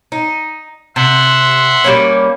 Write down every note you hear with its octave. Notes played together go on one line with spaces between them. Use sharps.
D#4
C3 E5 F#5 C6
G3 A#3 C#4